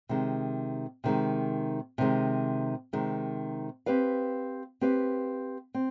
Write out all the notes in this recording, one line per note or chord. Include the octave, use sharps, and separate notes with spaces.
C3 D#3 G#3
C3 D#3 G#3
C3 D#3 G#3
C3 D#3 G#3
C4 G4 B4 F5
C4 G4 B4 F5
C4